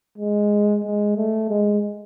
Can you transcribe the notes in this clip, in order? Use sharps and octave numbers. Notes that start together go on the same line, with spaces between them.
G#3
G#3
A3
G#3